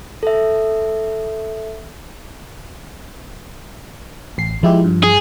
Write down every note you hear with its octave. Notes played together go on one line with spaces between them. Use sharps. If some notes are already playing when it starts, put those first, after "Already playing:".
A4 E5
A1 C7
F3 G#3 E4 G4
G2
G#4